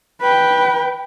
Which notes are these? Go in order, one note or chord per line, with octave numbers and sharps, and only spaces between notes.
B4 G5